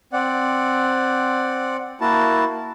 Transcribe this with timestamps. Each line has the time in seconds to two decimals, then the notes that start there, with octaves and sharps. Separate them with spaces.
0.13 C4 D5 F#5
2.01 A#3 E4 F#4 A5